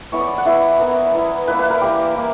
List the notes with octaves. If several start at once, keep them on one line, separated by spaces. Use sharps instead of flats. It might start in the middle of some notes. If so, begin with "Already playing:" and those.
E3 B3 E4 C#5
D5
F#5
E3 B3 E4 E5
E3 B3 E4 A#4
E3 B3 E4
E3 A#3 E4 B4
B4
A#4
E3 A#3 E4 G4
E3 A#3